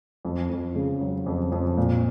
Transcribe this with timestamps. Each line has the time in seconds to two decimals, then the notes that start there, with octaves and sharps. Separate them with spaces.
0.25 F2
0.49 F2
0.75 C#3
1.01 F#3
1.26 F2
1.52 F2
1.77 A#2